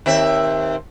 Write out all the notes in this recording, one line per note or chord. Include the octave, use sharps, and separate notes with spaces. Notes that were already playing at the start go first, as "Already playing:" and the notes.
D#2 C4 E5